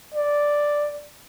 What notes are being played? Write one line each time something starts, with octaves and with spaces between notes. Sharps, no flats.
D5